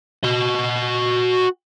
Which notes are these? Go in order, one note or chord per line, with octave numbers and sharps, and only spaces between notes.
F#4 D#5